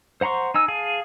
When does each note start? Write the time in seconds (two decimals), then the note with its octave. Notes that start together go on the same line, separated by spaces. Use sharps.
0.21 C5 F#5 A#5 C6 C#6
0.54 D#4 G#5 E6
0.68 G#4 F5 G#5 A5